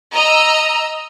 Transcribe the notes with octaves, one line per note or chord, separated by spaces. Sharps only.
D#5 A#5 E6